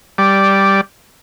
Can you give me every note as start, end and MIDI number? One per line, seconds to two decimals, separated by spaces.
0.18 0.81 55
0.18 0.81 74